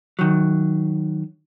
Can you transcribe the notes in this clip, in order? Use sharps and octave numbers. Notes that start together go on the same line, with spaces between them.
D#3 F#3